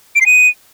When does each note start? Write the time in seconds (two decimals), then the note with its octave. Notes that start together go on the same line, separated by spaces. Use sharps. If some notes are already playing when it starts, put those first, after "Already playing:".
0.16 D7
0.21 C7
0.26 D#7